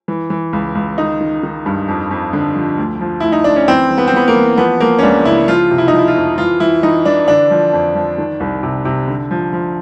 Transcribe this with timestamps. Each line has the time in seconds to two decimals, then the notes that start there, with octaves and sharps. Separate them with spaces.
0.08 E3
0.30 E3
0.53 C#2
0.75 C#2
0.98 D#3 D#4
1.20 D#3
1.43 D#3
1.66 G2
1.88 F2
2.11 F2
2.33 D3
2.55 F3
2.78 D2
3.01 F3
3.20 D2 E4
3.32 D#4
3.44 D2 D4
3.56 C#4
3.68 E3 C4
3.90 E3
3.98 B3
4.08 C4
4.13 E3 B3
4.28 A#3
4.36 E3
4.58 F3 B3
4.80 F3 A#3
4.99 C#4
5.03 C#2 D4
5.25 C#3 E4
5.48 F3 F4
5.71 C3
5.78 E4
5.88 D#4
5.93 F3 E4
6.08 F4
6.15 F2
6.38 E3 F4
6.60 E3 E4
6.83 E3 D#4
7.05 E3 D4
7.28 D3 D4
7.51 F3
7.73 F2
7.95 F3
8.18 D#3
8.40 C2
8.63 C3
8.85 C3
9.08 D3
9.31 F3
9.53 F3